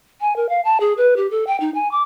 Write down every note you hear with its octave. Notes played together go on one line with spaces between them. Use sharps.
G#5
A#4
F5
A5
G#4
B4
G4
A4
G5
D#4
G#5
D6